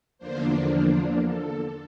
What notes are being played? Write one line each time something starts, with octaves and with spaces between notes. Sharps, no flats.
E2 D3 F3 A#3 D4 C5
A#4
A4